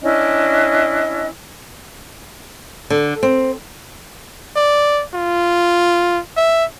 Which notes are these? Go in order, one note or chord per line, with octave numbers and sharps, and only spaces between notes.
C#4 D4 E4 D#5
D3
C4
D5
F4
E5